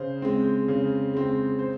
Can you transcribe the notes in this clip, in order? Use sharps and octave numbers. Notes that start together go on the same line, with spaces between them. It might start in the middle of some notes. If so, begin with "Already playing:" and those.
Already playing: C#3 C5
G#3 C4
C#3
G#3 C4
C5